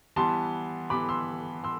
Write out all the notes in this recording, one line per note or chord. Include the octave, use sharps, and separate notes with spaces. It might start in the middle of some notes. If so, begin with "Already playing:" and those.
E3 G3 B3 A5 C6
E3 G3 B3 B5 D6
C6 E6
C6 E6